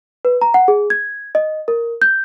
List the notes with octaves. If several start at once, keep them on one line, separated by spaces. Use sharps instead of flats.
B4
A#5
F#5
G#4
G#6
D#5
A#4
G6